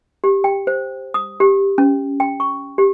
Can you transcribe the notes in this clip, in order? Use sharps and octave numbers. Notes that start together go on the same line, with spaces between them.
G4
G5
C5
D#6
G4
C#4
G5
C#6
G4